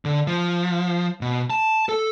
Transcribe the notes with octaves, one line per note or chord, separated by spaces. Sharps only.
D3
F3
B2
A5
A4